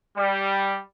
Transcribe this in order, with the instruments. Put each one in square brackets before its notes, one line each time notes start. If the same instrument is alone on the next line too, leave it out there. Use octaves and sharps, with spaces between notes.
[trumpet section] G3